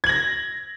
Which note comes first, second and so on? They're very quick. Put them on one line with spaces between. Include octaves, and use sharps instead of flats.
G#6 F#7 A#6